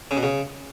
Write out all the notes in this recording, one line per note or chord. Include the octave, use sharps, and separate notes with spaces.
C#3
B2
C#3